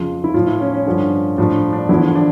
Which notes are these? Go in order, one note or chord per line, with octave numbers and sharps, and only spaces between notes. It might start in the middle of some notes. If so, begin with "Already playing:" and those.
Already playing: F2 C#3 F3 F4
E4
A2 F3 F4
E4
C#4
C#4
G2 D3 F3
A2 F3 D4
D4
E2 D3 F3 E4
D4